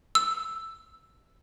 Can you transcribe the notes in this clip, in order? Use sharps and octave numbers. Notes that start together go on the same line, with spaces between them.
E6